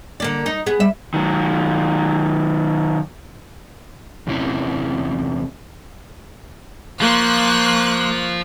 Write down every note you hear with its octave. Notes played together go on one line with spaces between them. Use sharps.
D3 A#3 D5
D#4
B3 G#4
G3 E5
D#3 F#3
E2 C3 E3 C#4 E4
F3 A#3 C6 C#6 F#6